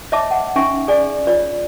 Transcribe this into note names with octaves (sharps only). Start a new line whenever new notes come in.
C#5 D#5 E5 A5 D6
F#5
C#4 D#4 E5 G#5 C#6
G#4 D5 G#5
F4 C#5 D5